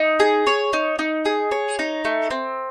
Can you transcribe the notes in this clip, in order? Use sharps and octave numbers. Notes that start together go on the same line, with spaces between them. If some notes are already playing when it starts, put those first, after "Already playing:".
Already playing: D#4
G#4
C#5
D#4
D#4
G#4
C#5
D#4
A3
C4